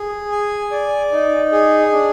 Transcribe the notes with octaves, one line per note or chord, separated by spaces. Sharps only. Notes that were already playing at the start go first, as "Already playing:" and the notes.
Already playing: G#4
G#5
D5
D#4
G#4
D4